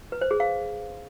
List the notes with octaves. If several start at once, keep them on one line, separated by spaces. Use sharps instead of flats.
B4
C5
G#4
F5